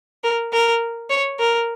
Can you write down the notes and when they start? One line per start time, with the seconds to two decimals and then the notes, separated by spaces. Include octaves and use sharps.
0.24 A#4
0.53 A#4
1.10 C#5
1.39 A#4